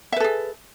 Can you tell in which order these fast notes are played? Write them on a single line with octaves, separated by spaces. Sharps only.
E5 B4 A4 G#4